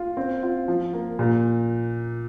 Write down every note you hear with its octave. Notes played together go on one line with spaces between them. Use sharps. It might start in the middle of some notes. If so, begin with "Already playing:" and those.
Already playing: F4
C4
F4
F3
A#3
A#2